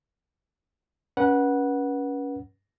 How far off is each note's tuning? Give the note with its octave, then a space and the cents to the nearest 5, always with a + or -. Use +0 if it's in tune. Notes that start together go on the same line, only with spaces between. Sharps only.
C#4 +20 B4 -30 F#5 +0